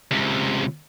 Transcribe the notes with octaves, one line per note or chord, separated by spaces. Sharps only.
C#2 C3